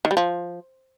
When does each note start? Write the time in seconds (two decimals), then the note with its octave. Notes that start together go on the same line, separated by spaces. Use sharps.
0.05 D#3
0.11 G3
0.17 F3